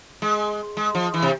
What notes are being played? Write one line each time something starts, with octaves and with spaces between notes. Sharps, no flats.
G#3
G#3
F3
E3
C3